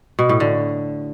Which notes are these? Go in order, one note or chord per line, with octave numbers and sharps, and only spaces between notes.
B2
A2
D3